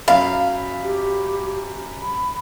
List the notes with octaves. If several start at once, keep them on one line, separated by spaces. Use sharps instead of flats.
F#2 F5 B5
G4
B5